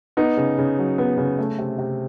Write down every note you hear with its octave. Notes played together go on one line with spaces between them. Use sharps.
B3 D#4
C#3
C#3
F#3
B3
C#3
A3
C3
C3